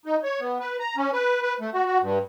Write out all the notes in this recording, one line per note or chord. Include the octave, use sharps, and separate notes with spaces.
D#4
C#5
B3
B4
A#5
C#4
B4
B4
A3
F#4
F#4
G2